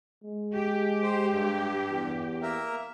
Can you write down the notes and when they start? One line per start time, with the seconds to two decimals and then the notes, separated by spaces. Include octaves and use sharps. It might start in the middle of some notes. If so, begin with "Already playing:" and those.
0.24 G#3
0.54 G4
1.03 C5
1.31 G2
1.90 E2
2.42 A#3 A#4 E5